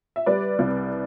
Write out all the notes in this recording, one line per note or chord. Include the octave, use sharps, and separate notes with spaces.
E5
G3 B4 D5
C2